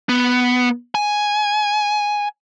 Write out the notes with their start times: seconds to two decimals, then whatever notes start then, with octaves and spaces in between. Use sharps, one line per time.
0.09 B3
0.95 G#5